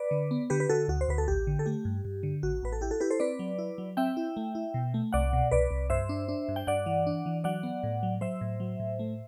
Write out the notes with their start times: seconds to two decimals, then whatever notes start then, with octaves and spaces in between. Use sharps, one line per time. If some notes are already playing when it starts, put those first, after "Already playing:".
Already playing: B4 D5
0.11 D3
0.31 B3
0.50 D3 G4 B4
0.60 B4
0.69 D3 F#4 A4
0.88 D2 F#4
1.01 C5
1.08 D2 B4
1.18 A4
1.28 A1 G4
1.47 D3
1.59 A4
1.66 A3 G4
1.85 G2
2.05 G2
2.23 D3
2.43 A1 F#4
2.63 A1 B4
2.72 A4
2.81 E4 G4
2.91 F#4 A4
3.00 E4 G4 B4
3.11 A4 C5
3.20 C4 B4 D5
3.39 F#3
3.59 E4
3.78 F#3
3.97 C4 E5 G5
4.17 E4
4.37 A3
4.55 E4
4.74 B2
4.94 A3
5.13 C2 D5 F#5
5.33 B2
5.51 C2 B4 D5
5.71 C2
5.90 G2 C5 E5
6.09 D4
6.28 D4
6.49 G2
6.56 G5
6.67 G2 D5 F#5
6.86 E3
7.07 D4
7.26 E3
7.44 F#3 D5 F#5
7.63 B3
7.83 A2
8.03 F#3
8.21 F#3 C5 E5
8.41 A2
8.60 F#3
8.80 A2
8.99 A3